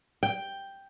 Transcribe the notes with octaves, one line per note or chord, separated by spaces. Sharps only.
G5